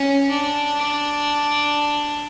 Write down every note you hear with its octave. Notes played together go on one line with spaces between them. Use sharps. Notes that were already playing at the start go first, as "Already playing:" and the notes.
Already playing: C#4
D4